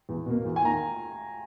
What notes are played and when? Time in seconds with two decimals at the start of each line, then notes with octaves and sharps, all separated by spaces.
0.09 E2
0.26 B2 A#3
0.45 E2
0.56 G#5
0.63 D#3 A#3 A#5